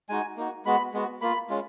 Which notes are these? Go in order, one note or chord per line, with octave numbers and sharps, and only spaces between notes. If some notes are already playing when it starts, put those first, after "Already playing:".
G#3 D#4 F#4 G#5
A#3 D#4 F#4
G#3 B3 F#4 B5
G#3 B3 F#4
A#3 F4 B5
G#3 C#4 F4